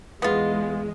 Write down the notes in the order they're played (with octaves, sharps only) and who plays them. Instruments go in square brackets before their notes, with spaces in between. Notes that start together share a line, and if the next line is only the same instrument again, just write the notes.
[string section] E2 G#3 [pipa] B3 F4